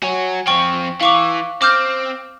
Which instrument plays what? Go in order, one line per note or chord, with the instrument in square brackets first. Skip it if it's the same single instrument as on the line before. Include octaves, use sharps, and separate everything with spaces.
[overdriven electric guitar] F#4 C#5 [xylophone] G#5
[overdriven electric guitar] F3 C4 [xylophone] G5 C#6
[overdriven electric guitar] E3 [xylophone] F5 C#6 D6
[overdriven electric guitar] C4 [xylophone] D6 F6 G6